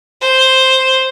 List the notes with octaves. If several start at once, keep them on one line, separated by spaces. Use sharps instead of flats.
C5